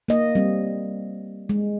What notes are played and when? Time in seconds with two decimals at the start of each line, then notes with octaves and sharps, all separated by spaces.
0.08 A#3 D#5
0.35 G3 C4
1.49 G#3